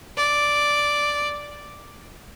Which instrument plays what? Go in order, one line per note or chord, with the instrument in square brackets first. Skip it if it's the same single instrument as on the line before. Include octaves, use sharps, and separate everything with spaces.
[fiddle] D5